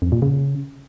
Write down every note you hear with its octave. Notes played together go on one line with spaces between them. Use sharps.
F2
A#2
C#3